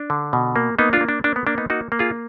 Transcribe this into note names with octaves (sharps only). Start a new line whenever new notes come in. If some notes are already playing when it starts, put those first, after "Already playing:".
Already playing: D4
D3
B2
A#3
A#3 B3 D#4
D4 F4
A#3
D4
A#3 D4
B3
A#3 D4
B3 D#4
A#3 D#4 F#4
A#3
F4 G#4